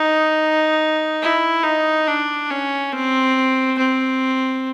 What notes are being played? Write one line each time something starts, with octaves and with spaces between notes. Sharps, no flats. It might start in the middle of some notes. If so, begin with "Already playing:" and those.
Already playing: D#4
E4
D#4
D4
C#4
C4
C4